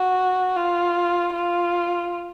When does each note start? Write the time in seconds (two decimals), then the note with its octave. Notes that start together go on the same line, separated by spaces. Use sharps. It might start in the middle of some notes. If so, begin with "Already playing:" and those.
Already playing: F#4
0.56 F4
1.33 F4